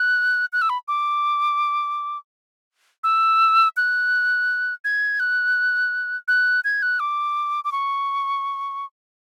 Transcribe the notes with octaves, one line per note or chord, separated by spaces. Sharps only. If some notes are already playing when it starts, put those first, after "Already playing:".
Already playing: F#6
F#6
E6
B5
D6
E6
F#6
G#6
F#6
F#6
G#6
F#6
D6
D6
C#6